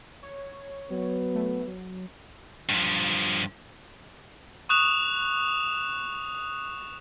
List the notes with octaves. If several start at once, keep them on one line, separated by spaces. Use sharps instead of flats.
C#5
F#3 B3
A3
F#3
G2 F3
C#6 D#6 F#6 E7 F7